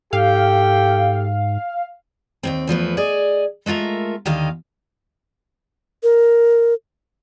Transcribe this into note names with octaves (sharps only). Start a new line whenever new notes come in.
G#2 G4 A4 F5 G5
D#2 G#2 C4
E2 F3 A3 B4
G#4 D5 D#5
G#3 A3 F4 A#4 E5
D#2 D3 D#3 D#5 F5
A#4